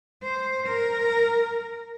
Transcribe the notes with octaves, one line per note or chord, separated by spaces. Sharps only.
C5
A#4